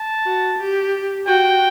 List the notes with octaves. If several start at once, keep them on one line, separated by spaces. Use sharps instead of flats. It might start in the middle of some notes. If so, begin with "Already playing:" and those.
Already playing: A5
F#4
G4
F#4 G5